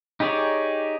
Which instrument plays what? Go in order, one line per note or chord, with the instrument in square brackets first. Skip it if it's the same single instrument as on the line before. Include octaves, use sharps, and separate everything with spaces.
[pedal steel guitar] D#4 G4 G#4 C#5 D5